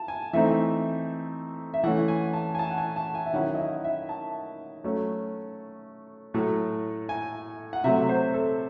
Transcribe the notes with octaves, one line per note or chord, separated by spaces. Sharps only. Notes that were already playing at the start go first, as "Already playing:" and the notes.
Already playing: A5
G#5
E3 A3 C4 D#4 E5
E5
E3 A3 C#4 F#5
G#5
A5
G#5
A5
F#5
G#5
A5
G#5
E5
D#3 F#3 C#4 E4 F#5
D#5
E5
E5
A5
F#3 A3 C#4
A2 F#3 A3
G#5
F#5
C3 F#3 A3 E5
C5
A4